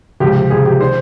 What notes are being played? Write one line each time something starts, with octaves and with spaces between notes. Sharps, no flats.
C#2 C3 F3 G4
C#2 C3 F3 G#4
G4
D#3 C5